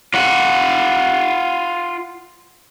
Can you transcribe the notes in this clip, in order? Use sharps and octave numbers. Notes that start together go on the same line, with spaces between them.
F4 F#5